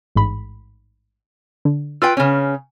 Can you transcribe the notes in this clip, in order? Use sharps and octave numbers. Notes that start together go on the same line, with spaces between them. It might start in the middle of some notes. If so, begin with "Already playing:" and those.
A1 G#2 B5
D3
F4 B4 G5 E6
C#3 C#4